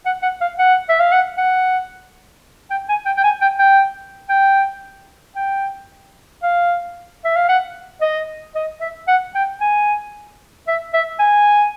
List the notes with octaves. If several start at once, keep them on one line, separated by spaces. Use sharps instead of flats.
F#5
F#5
F5
F#5
E5
F5
F#5
F#5
G5
G#5
G5
G5
G#5
G5
G5
G5
G5
F5
E5
F5
F#5
D#5
D#5
E5
F#5
G5
G#5
E5
E5
G#5